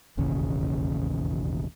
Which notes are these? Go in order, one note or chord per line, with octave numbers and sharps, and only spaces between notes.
E1 A1 D#2 C#3